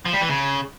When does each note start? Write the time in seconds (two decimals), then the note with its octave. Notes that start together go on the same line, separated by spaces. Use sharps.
0.06 F3
0.13 G3
0.21 E3
0.29 C#3